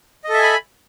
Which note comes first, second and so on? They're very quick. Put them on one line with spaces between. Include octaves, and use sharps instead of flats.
D#5 A4 E5 G#5 B5